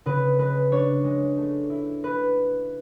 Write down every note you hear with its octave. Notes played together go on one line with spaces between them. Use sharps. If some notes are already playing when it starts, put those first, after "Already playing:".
C#3 B4
G#3 B4
D4 C#5
G#3
A3
E4
B4